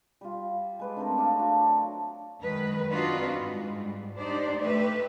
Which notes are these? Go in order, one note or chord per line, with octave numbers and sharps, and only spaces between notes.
G3 F4
G#3 B4 D5
D3 A3 C4 A#4
D4 D5 D#5 F5
D4 F#4 A4
F#3
F#2 D#3 G#3 B4
C4 D4 D#4 F4 F#4 B4
G#2 G3
D4 D#4 G4 C5 D5
A3 G4 B4 E5